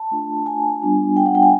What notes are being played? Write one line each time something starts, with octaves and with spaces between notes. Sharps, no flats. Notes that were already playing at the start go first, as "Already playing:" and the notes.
Already playing: A5
A3 D4 F4
G#5
G3 B3 D4 F4
G5
F#5
G5
G#5